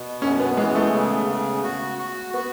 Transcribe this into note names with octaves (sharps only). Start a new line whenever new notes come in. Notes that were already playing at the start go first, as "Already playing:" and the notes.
Already playing: B2
F#2 C#4
B3
E3 G#3
A3
C#3
C#3
F#4
F#4
B3 F#4